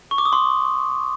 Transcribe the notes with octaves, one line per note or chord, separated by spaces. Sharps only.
C#6
D6
D#6
C6